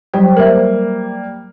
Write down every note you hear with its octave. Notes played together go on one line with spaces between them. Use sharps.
F#3 G3 G4 C5
G3 A#3 A#4 C5 E5